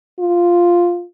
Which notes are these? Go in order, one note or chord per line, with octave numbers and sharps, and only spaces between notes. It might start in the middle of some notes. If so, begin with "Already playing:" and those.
F4